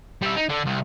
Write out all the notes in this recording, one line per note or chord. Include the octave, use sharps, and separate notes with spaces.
G3 E5
D#4
D3
C2